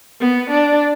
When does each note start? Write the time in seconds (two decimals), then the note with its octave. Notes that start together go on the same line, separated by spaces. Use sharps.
0.21 B3
0.50 D4